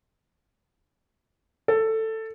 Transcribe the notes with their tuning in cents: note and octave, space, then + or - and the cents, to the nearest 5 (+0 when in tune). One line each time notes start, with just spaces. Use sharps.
A4 +10